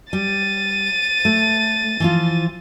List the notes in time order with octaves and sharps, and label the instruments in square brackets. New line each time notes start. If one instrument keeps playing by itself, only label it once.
[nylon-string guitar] G3 [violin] A6 D#7
[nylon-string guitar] A3
E3 F3 F4